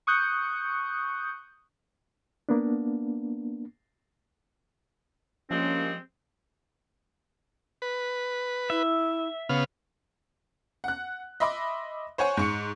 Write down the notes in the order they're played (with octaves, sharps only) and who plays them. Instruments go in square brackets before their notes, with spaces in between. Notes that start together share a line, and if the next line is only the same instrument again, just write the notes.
[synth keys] C#6 D#6 F#6 G6 C#7
[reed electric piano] A#3 B3 D4
[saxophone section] G2 G3 G#3 [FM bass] F3 [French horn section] A#3 C#4 [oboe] C4
[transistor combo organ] B4
[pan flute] E4 [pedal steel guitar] E5
[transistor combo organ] C#3 B3 F5
[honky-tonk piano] F#5 F#6
D#5 E5 B5 C6 D6
C5 C#5 F#5 G#5 C#6
G#2 C#6 C#7